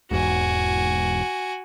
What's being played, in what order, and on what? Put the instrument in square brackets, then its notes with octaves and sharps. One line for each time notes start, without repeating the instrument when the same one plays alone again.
[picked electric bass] E1 E2 G#2 [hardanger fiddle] F#4 G#5